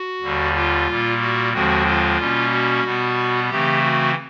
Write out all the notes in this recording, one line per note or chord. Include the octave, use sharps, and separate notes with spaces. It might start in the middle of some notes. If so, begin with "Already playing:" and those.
Already playing: F#4
D#2 D3 G3
F4
A#2 G3 A#3
F#4
D#2 D3 F3 G#3 C4 F#4
F4
B2 G3 A#3 C#4
F#4
B2 G3 B3
C#3 E3 A3 C4 G4
F#4